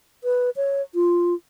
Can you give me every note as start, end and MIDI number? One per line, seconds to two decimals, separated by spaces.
0.24 0.50 71
0.56 0.82 73
0.95 1.34 65